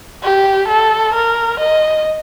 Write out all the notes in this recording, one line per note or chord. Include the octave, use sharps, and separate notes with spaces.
G4
A4
A#4
D#5